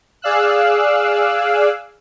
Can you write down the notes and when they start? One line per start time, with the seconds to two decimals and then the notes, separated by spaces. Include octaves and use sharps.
0.22 G#4 D5 F5 E6 F#6